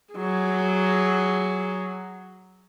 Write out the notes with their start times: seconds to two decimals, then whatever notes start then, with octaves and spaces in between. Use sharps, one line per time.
0.14 F#3 G#4